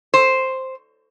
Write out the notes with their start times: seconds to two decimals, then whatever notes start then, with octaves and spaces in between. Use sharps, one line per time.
0.14 C5